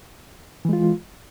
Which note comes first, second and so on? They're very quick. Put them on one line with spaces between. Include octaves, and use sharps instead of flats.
E3 G#3 F4